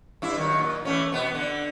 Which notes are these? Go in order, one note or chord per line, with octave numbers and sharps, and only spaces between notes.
G2 E4
D#3 F#3
A#2
E3 A3 C#4
B2 B3
D3